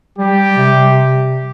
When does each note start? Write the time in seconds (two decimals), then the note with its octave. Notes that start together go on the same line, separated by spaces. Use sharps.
0.19 G3 G4
0.57 C3